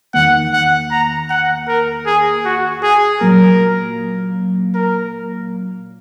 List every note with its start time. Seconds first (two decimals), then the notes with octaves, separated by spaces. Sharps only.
0.14 E2 D#3 A#3 F#5
0.53 F#5
0.91 A#5
1.30 F#5
1.68 A#4
2.06 G#4
2.45 F#4
2.83 G#4
3.21 A#2 F#3 A#3 A#4
4.75 A#4